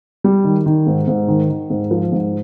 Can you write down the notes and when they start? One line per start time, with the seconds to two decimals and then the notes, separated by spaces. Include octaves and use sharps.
0.24 G3
0.44 D#3
0.66 D#3
0.87 G#2
1.08 G#2
1.28 D#3
1.50 D#3
1.70 G#2
1.91 F3
2.12 G#2